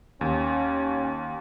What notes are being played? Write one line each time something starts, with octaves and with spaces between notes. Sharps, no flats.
D#2 C#4